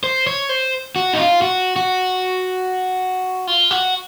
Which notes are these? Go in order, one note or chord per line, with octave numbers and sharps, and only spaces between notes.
C5
C#5
C5
F#4
D#4
F4
F#4
F#4
F4
F#4